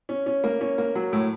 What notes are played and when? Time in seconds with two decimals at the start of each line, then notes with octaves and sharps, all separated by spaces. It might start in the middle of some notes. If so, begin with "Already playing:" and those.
0.09 C#4
0.26 C#4
0.44 A#3
0.61 C#4
0.78 A#3
0.95 F#3
1.13 A2